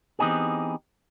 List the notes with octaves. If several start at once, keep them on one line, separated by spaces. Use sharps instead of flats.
E3 B3 C4 D#4 G4 G#4